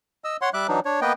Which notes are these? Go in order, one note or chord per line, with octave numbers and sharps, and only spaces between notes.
D#5 E6
C#5 F#5 C6
G3 E5 D6 F#6
E3 F#3 D4 D#4
D4 C#5
A#3 B3 B4 D#5 G5